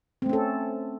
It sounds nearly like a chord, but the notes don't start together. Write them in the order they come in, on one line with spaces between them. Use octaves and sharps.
C4 A3 C#4 A4